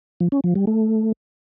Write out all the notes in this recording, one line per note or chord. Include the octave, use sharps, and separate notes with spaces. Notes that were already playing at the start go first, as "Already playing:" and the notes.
F3
C#4
F3
G3
A3